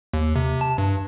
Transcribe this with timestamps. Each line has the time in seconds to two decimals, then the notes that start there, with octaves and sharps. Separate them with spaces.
0.14 D#2
0.36 C3
0.61 A5
0.78 G2